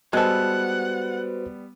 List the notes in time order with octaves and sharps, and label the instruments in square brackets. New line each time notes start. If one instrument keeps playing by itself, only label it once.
[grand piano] G3 B3 [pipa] G#3 A4 [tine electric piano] F#4 B4 C5 [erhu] F#5